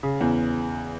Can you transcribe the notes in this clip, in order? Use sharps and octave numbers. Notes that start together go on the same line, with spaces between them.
C#3
E2